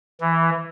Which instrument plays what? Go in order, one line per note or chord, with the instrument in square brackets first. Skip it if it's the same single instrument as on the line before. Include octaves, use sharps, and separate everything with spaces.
[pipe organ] E3